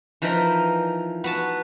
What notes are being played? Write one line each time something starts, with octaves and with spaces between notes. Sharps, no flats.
E3 F3 D#4 A#4 B5
B3 F#4 A5